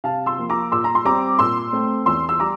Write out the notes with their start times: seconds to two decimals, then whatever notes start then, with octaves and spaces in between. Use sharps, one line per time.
0.04 C3 F5 A5
0.26 C6 E6
0.38 F3 A#3
0.50 A#5 D6
0.72 A#2 C6 E6
0.84 A#5
0.95 C6
1.05 G3 C4 A#5 D6
1.39 A#2 C6 E6
1.73 A3 C4
2.06 E2 C6 E6
2.29 E6
2.40 G3 A#5 D6